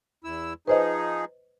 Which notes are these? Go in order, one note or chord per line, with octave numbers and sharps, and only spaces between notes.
E2 E4 E6
F3 D#4 G#4 B4 C5 D#5